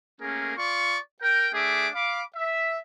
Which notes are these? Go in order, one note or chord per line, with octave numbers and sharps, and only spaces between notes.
A3 A#3 C#4 G#4 A#4
F4 D5 C6 C#6
A#4 G5
A3 D4 G#4 E5 D6
F5 B5 D6
E5